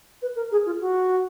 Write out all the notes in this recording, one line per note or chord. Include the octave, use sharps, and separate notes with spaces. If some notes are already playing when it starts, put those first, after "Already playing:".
B4
A#4
G#4
F4
F#4